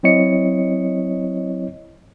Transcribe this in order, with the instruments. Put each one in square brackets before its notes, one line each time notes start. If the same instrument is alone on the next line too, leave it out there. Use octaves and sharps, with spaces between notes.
[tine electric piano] F#3 C4 E4 C#5 D#5 C#7